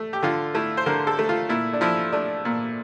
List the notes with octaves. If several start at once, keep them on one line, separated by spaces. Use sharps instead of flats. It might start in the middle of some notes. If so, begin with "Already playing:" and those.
Already playing: A3
G4
D3 F4
A3 E4
C5
D3 A#4
A4
A3
F4
A#2 E4
D4
F3 E4
A3 D4
A#2